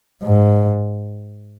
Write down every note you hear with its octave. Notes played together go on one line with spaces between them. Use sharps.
G#2